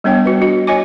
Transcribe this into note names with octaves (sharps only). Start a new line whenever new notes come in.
G3 B3 D4 C#5 G5
F#4 B4
F#4 D#5
F#4 C#5 D#5 G#5 D6